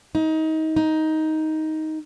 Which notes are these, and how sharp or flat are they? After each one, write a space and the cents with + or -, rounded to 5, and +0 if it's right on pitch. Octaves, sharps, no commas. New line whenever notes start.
D#4 +25
D#4 +10